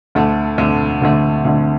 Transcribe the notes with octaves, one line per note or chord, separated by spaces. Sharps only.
D2 D3 A3
D2 D3 A3
D2 D3 A3
D2 D3 A3